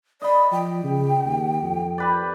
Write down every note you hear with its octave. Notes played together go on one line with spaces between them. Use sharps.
D5 D#5 B5
F3 G5
C#3
D#2
F2
G4 B4 D5